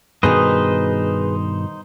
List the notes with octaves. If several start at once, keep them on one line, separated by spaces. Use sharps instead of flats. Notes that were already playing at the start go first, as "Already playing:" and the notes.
G2 B2 D#3 D#4 G#4 B4 C5 D#5